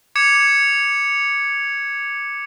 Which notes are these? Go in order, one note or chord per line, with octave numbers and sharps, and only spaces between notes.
D6 G#6 C#7 E7